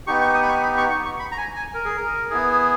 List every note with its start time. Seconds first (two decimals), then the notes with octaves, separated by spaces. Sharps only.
0.07 B3 D#4 G4 C#6
0.21 C#6
0.35 D#6
0.43 B5
0.49 C#6
0.63 B5
0.77 C#6
0.91 C#6
1.05 C#6
1.19 B5
1.32 A#5
1.38 G#5
1.56 G#5
1.74 A#4
1.85 G#4
1.97 A#4
2.30 B3 E4 G#4